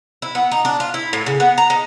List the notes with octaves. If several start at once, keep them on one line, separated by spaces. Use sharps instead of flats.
E4
B3
D#4
D4
F4
E4
A2
C#3
B3
A#5
D#4